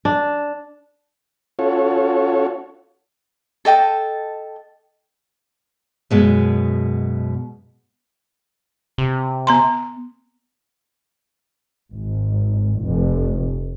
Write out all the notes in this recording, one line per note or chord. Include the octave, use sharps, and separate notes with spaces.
D4
C#4 F4 F#4 A4 C#5
A4 D#5 G5 A5
F#2 B2 G#3
C3
B3 A#5 C6
G#1
F1